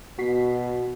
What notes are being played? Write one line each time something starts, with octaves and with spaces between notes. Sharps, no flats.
B2 F#4 B6 C7